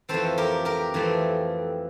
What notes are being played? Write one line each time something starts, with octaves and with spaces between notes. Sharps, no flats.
F2 E3 A3 C4 A4 C5
G4 A#4
G4 A#4
F2 E3 A3 C4